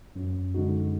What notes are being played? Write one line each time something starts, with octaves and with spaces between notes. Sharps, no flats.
F#2
D3 G#3 D#4 F#4